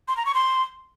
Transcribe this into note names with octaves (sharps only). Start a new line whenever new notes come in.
C6
A#5
C#6
C6